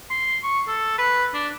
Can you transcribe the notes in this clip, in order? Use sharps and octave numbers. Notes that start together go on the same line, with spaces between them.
C6
C#6
A4
B4
D4